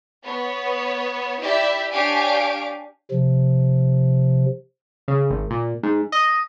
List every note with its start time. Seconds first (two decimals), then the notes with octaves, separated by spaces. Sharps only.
0.25 B3 C#5
1.41 E4 G4 D5 E5
1.92 D4 G4 C#5 F5 G#5 D7
3.11 C3 F3
5.08 C#3
5.30 G#1
5.50 A#2
5.83 G#2
6.12 D#5